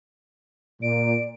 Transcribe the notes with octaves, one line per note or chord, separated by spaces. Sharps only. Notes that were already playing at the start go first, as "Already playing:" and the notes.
A#2 D5 D7